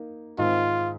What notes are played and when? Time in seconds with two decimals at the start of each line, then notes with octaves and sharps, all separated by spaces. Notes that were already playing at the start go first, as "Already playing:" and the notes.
Already playing: A#3 D#4
0.38 G#2 D#3 C4 F4